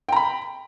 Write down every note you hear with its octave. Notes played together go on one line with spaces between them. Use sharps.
G5 A#5 B5